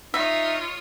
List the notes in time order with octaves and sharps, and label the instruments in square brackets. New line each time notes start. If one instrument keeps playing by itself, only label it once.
[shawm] D#4 [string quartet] F4 C#5 D#5 [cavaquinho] E5